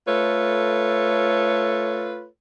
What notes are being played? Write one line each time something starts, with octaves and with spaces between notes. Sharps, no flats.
A3 F4 A4 B4 C#5